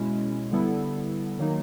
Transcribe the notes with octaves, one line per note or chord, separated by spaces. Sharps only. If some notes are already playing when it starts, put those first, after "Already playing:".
Already playing: B2 G#3 C#4 E4
D3 G3 B3 E4 A4
D#3 F#3 A#3 D#4